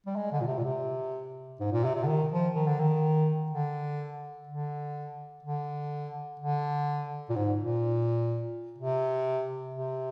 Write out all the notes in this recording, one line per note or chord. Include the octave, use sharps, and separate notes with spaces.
G3
G#3
D3
A#2
C3
A#2
C3
G#2
A#2
C3
C3
D3
D#3
F3
D#3
D3
D#3
D3
D3
D3
D3
A#2
G#2
A#2
C3
C3